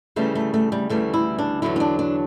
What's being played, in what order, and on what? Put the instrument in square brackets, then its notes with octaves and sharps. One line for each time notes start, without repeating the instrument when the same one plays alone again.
[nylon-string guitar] D2 C#3 E3 G3 A3
A3
A3
G3
D2 C#3 E3 G3 A3
E4
D4
E2 D3 F#3 E4
C#4
D4
D4